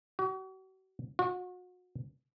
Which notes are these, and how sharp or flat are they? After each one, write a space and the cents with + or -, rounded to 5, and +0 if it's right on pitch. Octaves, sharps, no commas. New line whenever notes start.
F#4 +40
F#4 -35